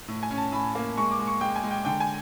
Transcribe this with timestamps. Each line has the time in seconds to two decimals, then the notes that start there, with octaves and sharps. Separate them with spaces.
0.08 A2
0.23 G#5
0.31 C#4
0.38 A5
0.52 A2 B5
0.75 A#3
0.97 G#3 C#6
1.11 D6
1.19 G#3
1.27 C#6
1.41 G#3 G5
1.56 G#5
1.64 G#3
1.71 G5
1.85 D3 G5
2.00 G#5